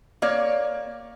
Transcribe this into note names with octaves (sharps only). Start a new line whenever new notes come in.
A#3 C#5 D5